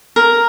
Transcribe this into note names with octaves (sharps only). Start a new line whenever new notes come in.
A#4